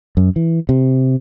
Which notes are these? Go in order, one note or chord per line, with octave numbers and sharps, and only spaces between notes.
F#2
E3
C3